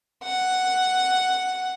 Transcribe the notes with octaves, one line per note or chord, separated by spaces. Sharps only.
F#5